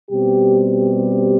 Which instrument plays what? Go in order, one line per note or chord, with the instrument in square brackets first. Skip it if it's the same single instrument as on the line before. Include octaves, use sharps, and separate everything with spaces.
[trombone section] B2 G3 C4 G4
G4